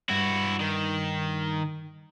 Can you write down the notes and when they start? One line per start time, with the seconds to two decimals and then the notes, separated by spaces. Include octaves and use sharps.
0.10 G2 E4 F#4
0.60 D#3